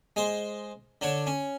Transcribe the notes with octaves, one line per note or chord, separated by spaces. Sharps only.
G#3 C5
D3 D4 C#5
C#4